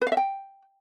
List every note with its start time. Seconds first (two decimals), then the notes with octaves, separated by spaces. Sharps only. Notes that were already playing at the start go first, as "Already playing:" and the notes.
0.01 B4
0.07 F5
0.12 E5
0.17 G5